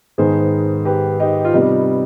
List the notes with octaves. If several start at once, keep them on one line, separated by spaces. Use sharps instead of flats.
G#2 D#3 B3 G#4 C5
G4 B4
D#4 G4
F4
C3 G3 B3 D#4